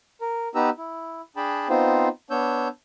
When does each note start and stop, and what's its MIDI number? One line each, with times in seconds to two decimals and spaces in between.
0.21 0.48 70
0.55 0.70 59
0.55 0.70 63
0.55 0.70 67
0.55 0.70 71
0.55 0.70 82
0.55 0.70 88
0.78 1.21 64
1.36 1.68 62
1.36 1.68 68
1.36 1.68 79
1.36 1.68 81
1.36 1.68 83
1.69 2.08 59
1.69 2.08 60
1.69 2.08 63
1.69 2.08 65
1.69 2.08 72
2.31 2.68 59
2.31 2.68 62
2.31 2.68 73
2.31 2.68 88
2.31 2.68 91